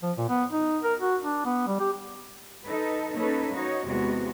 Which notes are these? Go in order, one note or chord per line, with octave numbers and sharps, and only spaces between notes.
F3
A#2
B3
D#4
A#4
F#4
D4
B3
G3
G4
D#4 A4 B4
A#3 C#4 D#4 A4 B4
D#4 F#4 C#5
E2 C3 G#3 B3 F#4